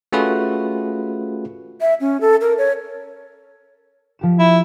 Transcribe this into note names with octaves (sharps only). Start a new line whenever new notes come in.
A3 C#4 F4 F#4 G#4 B4
E5
C#4
A4
A#4
C#5
F3 G4 E7
E4